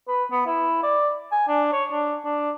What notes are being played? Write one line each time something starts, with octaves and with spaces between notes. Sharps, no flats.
B4
B3
E4
D5
G#5
D4
C#5
D4
D4